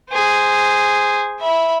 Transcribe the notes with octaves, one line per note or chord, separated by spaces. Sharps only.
G#4 C5
E5 B5